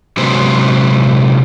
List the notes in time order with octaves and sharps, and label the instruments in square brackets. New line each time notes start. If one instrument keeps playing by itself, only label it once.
[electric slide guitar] C3 F#3 G#3 C#4 B4 C5